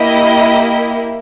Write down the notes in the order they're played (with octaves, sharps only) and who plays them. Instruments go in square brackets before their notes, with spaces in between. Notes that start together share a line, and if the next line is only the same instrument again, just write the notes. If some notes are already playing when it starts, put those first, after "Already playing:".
Already playing: [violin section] A#3 E4 G4 D#5